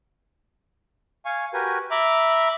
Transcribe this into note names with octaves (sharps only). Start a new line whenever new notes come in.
F5 G#5 C#6
F#4 G4 A#4 B4 G#5
E5 A#5 B5 D6